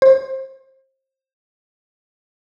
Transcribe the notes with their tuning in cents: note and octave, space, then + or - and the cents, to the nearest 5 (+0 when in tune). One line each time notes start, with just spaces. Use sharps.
C5 +25